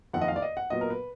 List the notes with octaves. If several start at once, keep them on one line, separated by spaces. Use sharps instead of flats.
F#1 F2 D#3 F#5
D#5
F5
D5
D#5
F#5
A#2 F#3 B3 D#5
A#4
B4